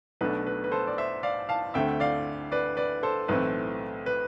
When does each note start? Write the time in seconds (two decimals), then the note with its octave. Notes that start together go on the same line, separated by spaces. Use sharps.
0.21 B1 B2 A3 D4 B4
0.47 B4
0.64 B4
0.71 A4 C5
0.87 D5
0.98 C5 E5
1.23 D5 F5
1.49 F5 A5
1.74 D2 D3 A3 C4 E5 G5
2.00 D5 F5
2.52 B4 D5
2.77 B4 D5
3.03 A4 C5
3.28 B1 A2 E3 A3 C4 B4
4.06 B4